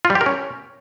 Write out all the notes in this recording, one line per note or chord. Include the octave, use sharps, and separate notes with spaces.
F4
G3
G4
A#4
C#4